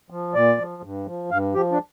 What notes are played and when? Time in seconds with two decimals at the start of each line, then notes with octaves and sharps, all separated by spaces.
0.10 F3
0.34 A#2 D5
0.58 F3
0.83 G2
1.06 F3
1.30 G2 F5
1.54 F3 G4
1.72 D4